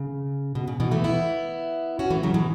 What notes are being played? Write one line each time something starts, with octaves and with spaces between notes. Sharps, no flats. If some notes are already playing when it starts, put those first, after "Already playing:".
Already playing: C#3
B2
C#3
B2 E3
E3 A3
B3 E4
C#4 F#4
E3 A3
C#3 F#3
B2 E3